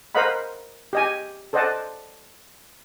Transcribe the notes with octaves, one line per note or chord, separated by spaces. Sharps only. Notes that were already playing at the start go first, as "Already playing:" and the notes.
A#4 C5 D#5 F5 F#5 B5
G4 D#5 G#5
A4 C5 D5 D#5 F#5 A5